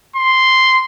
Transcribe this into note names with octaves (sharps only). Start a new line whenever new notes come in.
C6